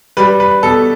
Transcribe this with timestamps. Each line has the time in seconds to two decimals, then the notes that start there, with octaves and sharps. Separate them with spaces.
0.17 G3 B4
0.40 B4
0.63 B2 A4